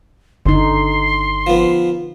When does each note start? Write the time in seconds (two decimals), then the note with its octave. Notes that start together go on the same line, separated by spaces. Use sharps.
0.46 G1 D3 D#4 C6
1.47 F3 B3